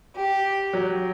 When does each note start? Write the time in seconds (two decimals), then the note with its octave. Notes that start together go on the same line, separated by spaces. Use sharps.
0.17 G4
0.73 F#3